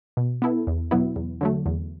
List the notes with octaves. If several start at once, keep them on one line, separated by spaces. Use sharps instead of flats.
B2
B3 E4 A4
E2
B2 F#3 B3 E4
E2
D3 F#3 A3
E2